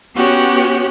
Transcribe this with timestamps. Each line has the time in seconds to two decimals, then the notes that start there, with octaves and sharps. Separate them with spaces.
0.16 B3 C#4 F#4 G4 C#5